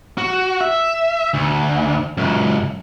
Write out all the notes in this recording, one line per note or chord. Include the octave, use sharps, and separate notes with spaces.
F#4
E5
D2
C#2 F#2